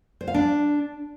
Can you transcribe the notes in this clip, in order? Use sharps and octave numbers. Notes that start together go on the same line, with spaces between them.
C5
F5
D4